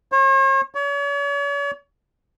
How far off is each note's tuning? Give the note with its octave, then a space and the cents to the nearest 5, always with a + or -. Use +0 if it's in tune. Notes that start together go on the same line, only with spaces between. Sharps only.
C#5 -45
C#5 +40